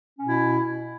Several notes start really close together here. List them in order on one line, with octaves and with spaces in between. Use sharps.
C#4 B2 E4